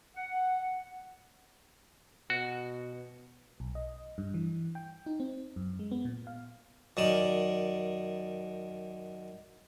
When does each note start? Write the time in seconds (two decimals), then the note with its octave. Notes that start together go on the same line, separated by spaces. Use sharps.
0.16 F#5
2.30 B2 F#4
3.60 B1
3.75 D#5
4.18 G2
4.34 E3
4.75 G5
5.06 D#4
5.20 C4
5.56 F#2
5.79 G#3
5.92 B3
6.05 A#2
6.27 F5
6.97 F#2 D#3 D5